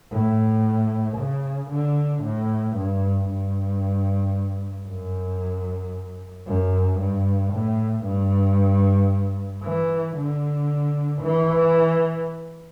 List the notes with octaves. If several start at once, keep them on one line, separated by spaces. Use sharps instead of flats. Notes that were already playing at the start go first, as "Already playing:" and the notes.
A2
C#3
D3
A2
G2
G2
F#2
F#2
G2
A2
G2
E3
D3
E3